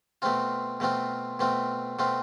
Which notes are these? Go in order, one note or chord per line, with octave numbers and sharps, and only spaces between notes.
B2 A3 C4 F4
B2 A3 C4 F4
B2 A3 C4 F4
B2 A3 C4 F4